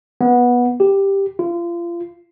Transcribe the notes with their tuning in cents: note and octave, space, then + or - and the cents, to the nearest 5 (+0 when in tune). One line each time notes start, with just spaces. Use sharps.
B3 -15
G4 +5
F4 -30